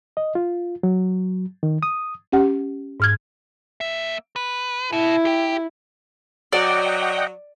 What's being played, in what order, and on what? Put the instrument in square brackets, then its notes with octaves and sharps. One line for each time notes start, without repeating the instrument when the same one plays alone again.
[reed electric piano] D#5
F4
F#3
D#3
D#6
[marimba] C#4 G4 F#5
G#2 F6 G#6
[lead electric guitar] A#3 E5
B4
[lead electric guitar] B2 [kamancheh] E4
[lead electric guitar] G4 G5
[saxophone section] F#3 F#4 [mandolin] D5 [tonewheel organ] D#5 F#5 G5